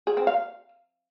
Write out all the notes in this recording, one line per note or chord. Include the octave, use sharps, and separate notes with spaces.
G#4
C4
F5